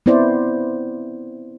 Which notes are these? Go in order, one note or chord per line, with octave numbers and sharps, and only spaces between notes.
B3 C4 E4 C5 D5